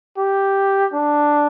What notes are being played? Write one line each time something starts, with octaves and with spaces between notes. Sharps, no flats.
G4
D4